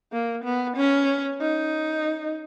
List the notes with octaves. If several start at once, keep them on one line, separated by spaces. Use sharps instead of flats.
A#3
B3
C#4
D#4